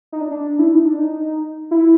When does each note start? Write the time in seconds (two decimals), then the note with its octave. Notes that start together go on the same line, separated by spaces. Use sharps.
0.12 D#4
0.21 D4
0.31 D4
0.59 E4
0.72 D#4
0.86 D4
0.99 D#4
1.71 E4